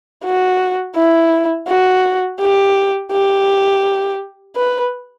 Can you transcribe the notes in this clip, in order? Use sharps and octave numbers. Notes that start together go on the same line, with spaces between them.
F#4
E4
F#4
G4
G4
B4